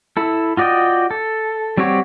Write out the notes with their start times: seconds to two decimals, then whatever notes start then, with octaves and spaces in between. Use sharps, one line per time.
0.17 E4 A4
0.57 F4 F#4 D5 D#5 G5
1.11 A4
1.77 G3 C4 F#4 G4 C#5